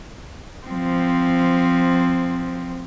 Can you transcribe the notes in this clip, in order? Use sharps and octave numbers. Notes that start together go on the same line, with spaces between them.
F3 C4